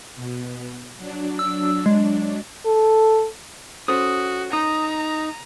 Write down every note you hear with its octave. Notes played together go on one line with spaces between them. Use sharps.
B2
F#3 D4
E6
G#3
A4
C#4 F#4 A4 C5 D#6
D#4 A#5 D#6